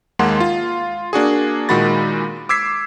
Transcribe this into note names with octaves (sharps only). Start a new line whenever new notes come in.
D#2 G#3 A#3 F#5 C6
F4
A#3 D4 F#4 G#4
A#2 D#3 G#3 F#4 B5 A6
D6 E6 G#6 B6 C7